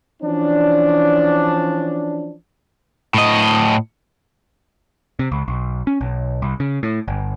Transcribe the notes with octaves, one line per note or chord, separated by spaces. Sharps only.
E3 F3 C#4 D4
A2 D#5
C3
C#2
B1
C#4
B1
C2
C#3
A2
G1